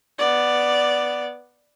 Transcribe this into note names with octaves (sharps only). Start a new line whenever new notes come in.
B3 D5